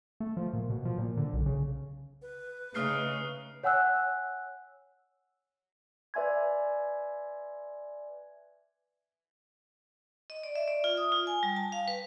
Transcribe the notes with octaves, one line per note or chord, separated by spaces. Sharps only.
A3
F3
A#2
B2
F3
A#2
D3
B1
C#3
B4
C#3 A3 D#4 D#6 F6 C7
C#5 F#5 G#5 E6 F#6
B4 D5 E5 G#5 C6 G#6
D#5
D5
E5
D5
F4
D#6
F4
G#5
G3
A5
F5
B4